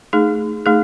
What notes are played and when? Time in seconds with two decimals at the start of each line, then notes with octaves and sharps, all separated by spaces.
0.13 A3 D#4 G#4
0.66 A3 D#4 G#4